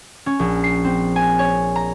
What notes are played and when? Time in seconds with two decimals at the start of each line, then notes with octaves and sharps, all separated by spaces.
0.26 C#4
0.39 A#1
0.64 C7
0.84 C4
1.16 G#5
1.39 C#5
1.76 A#5